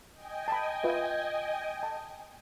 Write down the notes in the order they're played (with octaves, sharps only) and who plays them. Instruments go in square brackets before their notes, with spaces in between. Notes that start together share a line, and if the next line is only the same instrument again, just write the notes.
[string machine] D#5 G5 G#5
[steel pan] A5 B5
F4 B4 E5
A5